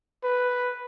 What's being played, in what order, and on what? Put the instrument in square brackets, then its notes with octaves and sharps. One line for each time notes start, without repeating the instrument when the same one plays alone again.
[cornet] B4